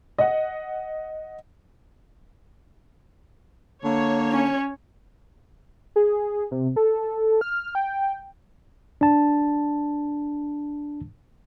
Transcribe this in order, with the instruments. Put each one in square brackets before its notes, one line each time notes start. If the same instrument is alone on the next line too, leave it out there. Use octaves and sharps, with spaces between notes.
[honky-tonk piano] D#5 F#5
[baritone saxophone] D3 [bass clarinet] A#3 [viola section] C#5
[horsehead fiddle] C#4
[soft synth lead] G#4
C3
A4
F6
G5
[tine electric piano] D4 A5